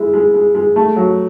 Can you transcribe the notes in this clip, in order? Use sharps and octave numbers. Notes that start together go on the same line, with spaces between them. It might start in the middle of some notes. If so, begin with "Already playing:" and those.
Already playing: G#3 E4
G#3
G#3
G#3
A3
F#3